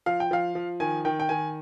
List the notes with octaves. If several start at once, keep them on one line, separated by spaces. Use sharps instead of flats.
F3 F5
G5
F3 F5
F3
D#3 G#5
D#3 G5
G5
D#3 G#5